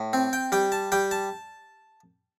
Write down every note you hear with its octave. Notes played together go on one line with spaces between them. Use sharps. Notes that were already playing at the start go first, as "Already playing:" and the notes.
Already playing: A2
C4
G5
G3 G5
A5
G3 G5
A5